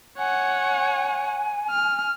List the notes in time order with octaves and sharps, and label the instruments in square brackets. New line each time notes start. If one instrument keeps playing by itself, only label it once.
[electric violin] C#5 F#5 [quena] G#5
[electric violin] F6